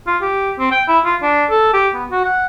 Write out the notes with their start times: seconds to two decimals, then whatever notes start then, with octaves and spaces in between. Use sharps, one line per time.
0.07 F4
0.22 G4
0.59 C4
0.72 G5
0.88 E4
1.05 F4
1.22 D4
1.50 A4
1.73 G4
1.94 B3
2.11 F#4
2.25 F#5